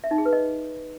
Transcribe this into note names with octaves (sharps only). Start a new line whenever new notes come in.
E5
D#4
G#4
B4
D#5